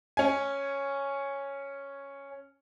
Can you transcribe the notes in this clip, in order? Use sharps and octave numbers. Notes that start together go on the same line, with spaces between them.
C#4 G#5